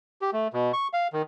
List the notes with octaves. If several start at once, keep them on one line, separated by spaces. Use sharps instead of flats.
G4
A3
B2
C#6
F5
D#3